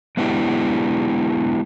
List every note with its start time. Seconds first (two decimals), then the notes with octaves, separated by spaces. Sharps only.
0.17 G#3 B3 D4 E4 G4